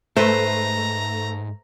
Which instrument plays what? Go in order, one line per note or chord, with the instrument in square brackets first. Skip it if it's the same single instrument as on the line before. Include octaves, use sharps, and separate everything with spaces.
[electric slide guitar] G#2 [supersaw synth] A3 [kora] B4 C5 [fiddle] A#5